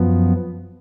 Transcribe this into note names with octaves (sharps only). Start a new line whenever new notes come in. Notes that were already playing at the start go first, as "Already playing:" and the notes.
Already playing: F#2 F3 B3